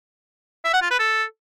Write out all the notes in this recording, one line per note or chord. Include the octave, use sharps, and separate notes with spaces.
E5
F#5
F4
B4
A4